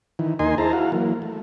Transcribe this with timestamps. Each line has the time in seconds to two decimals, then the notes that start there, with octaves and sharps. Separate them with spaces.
0.19 D#3 E3
0.39 D#2 A#3 D#4 D#5 G#5 C6
0.58 E4 G#4 C5 A5 A#5
0.73 E4 F#4 F5
0.92 E3 F#3 A#3
1.22 A3